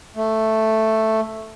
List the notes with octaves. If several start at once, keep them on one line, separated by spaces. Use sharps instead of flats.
A3